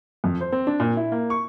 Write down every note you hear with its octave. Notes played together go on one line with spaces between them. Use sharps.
F2
C5
C4
D4
A#2
E4
A#3
C#6